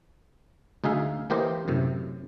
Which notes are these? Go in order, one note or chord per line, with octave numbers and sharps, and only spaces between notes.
D2 D#4 G#4 E5 F5
E3 A#3 G4 A#4 C5 D#5
F#2 A2 C3